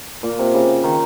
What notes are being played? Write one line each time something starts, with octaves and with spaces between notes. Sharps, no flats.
A#2
C3
C#3
D#3